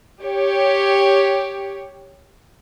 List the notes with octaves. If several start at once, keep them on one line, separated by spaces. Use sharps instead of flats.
G4 C#5